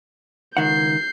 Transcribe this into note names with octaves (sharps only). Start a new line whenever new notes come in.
C#2 D#3 F#5 G6 C7